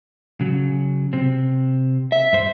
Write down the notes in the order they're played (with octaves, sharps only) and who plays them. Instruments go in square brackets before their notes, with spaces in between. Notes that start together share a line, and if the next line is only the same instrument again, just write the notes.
[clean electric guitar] C#3 F#3
C3 C4
[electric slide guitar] E5
[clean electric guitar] G2 C5